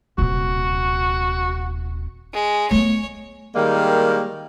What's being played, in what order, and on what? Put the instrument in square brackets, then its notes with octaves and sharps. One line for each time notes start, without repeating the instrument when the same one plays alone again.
[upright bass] D#1 C3 [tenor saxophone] F#4
[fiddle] G#3
[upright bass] A3 B3 [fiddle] C#5
[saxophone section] D#3 G3 G#3 A#3